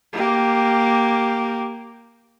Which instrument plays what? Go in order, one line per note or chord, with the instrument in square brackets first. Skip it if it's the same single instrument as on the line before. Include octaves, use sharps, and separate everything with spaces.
[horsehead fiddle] A#3 G4